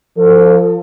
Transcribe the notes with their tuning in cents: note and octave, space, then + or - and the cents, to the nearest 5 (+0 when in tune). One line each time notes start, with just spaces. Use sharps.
F3 +0 A4 +35